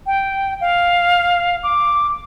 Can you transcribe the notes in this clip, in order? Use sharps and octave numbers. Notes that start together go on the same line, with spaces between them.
G5
F5
D6